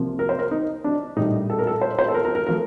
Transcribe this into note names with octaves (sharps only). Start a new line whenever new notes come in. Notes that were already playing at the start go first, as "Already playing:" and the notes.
Already playing: C2 C3 F3 A#3
A#4
C5
A#4
D#4
D4
A#1 A2 G3 D#4
A4
A#4
A4
C5
C5
A4
A#4
A#4
A#4
F3 A3 A#4